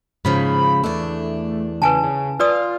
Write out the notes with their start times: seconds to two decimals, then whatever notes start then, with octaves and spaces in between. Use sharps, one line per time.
0.25 G#2 C#3 F3 B5
0.84 E2 A3 D4
1.82 C#3 B4 G#5 A5
2.03 C#3
2.39 F4 B4 D5 D#6